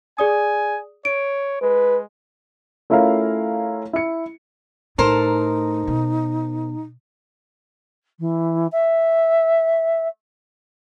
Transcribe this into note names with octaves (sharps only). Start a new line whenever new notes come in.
G#4 D5 G#5 D#6
C#5 D7
G#3 B4
A3 C#4 E4 F4 A#4 F5
E4 C#7
A2 D#4 A4 A#4 C5
B2
E3
E5